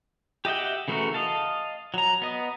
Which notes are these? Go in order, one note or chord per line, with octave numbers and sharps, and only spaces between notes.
G4 D#5 E5 F#5 G5
C#3 E3 A3 F#4 A#4
D#5 F5 A5
F#3 A#5
B3 D#5